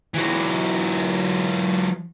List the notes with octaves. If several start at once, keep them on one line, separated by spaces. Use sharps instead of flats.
E3 F#3